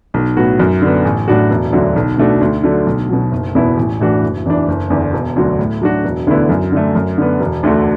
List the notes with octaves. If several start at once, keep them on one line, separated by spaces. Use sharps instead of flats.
B1
A2 F#3 B3 F#4
F#2
D3 B3
A1
A2 F#3 D4 F#4
E1
D2 D3 F#3
B1
B2 A3 D4 F#4
D2
D3 F#3 A3
B1
B2 F#3
F#1
E2 B2 B3 E4
A1
A2 E3 D4 F#4
F#1
E2 E3 D4
F#1
E2 D3
E1
D2 D3 F#3
A2
F#3 D4 F#4
E1
D2 D3 B3 E4
F#2
D3 A3
F#2
D3 B3
E1
D2 D3 A3 F#4